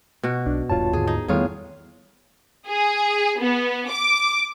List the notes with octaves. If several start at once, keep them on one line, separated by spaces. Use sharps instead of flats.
B2 F#4
B1 D4
D#1 G2 F4 C#5 A5
D#2 G#2 D3 G#4
D#4 G#4
E2 A2 D#3 G3 B3 F4 G#4 C#5
G#4
B3
D6